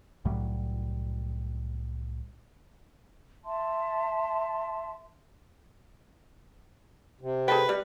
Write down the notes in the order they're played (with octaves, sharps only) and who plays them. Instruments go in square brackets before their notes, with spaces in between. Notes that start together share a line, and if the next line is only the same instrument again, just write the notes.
[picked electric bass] C2 A2 F#3 G3
[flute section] E5 A5 C6
[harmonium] C3
[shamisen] G#4 A4 G5 [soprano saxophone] B4
[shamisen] G3